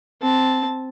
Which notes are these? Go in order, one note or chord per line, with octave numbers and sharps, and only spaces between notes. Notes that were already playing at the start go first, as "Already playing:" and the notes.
C4 A5